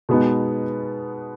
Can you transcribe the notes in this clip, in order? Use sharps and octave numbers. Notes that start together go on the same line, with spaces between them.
B2 G#3 B3 D#4